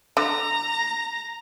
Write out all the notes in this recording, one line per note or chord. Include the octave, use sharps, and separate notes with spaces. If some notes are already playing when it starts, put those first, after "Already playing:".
D3 A#5